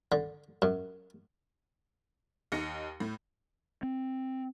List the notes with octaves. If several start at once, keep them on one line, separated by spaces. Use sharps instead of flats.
D3
F#2
D#2 D#4 A#6 C#7
A2
C4